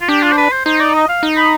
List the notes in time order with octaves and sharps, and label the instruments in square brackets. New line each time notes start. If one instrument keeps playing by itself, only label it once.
[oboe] F4
[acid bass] D4 [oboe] G4
[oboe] F4
C5
B4
C5
[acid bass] D#4 [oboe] C5
[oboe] D5
D#5
F5
[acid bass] D#4
[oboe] B5